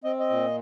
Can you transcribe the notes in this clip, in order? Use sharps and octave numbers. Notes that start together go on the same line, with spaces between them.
C4 D#5
D#5
A#2